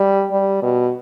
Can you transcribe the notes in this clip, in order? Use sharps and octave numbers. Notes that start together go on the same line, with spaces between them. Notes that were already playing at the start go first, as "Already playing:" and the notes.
Already playing: G3
G3
B2